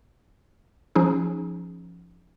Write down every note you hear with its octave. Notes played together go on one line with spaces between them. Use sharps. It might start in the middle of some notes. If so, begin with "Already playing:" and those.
F3 C#4 D#4 G#4